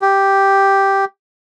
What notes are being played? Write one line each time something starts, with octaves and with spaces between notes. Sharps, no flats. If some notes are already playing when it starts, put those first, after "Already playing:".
G4